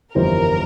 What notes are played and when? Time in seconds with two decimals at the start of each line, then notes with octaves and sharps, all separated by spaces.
0.15 G1 F2 E3 G3 C4 A#4